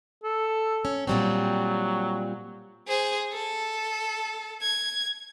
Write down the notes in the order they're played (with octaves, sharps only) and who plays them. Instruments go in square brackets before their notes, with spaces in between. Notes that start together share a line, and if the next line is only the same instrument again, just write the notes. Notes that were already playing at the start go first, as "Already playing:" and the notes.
[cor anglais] A4
[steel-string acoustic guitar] C#4
[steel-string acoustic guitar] A#2 G3 C4 [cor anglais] F#3
[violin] G#4 C5
A4
G#6